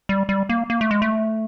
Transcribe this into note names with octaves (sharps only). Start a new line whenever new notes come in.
G3
G3
A#3
A#3
A3
G#3
A3